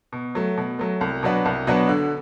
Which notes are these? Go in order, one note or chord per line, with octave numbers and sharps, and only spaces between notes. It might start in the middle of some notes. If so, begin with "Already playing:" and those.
B2
F#3 A3
B2
F#3 A3
C2
B2 F#3 B3 D4
C2
B2 F#3 B3 D4
D3